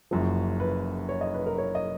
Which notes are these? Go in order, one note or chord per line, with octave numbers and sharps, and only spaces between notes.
F#1 F#2 F3
B4
C#5
D#5
B4
A#4
C#5
D#5